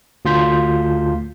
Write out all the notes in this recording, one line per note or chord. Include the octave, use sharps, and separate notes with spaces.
D2 F4 C6 G6 B6